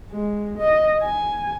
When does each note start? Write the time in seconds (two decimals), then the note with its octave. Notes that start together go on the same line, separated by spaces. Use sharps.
0.11 G#3
0.59 D#5
1.03 G#5